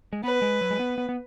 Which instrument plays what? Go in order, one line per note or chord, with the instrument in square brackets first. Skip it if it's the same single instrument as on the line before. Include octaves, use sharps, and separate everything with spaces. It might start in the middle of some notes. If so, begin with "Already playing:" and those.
[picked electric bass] G#3
[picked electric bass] B3 [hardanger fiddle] B4
[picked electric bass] G#3
F#3
G#3
B3
B3
B3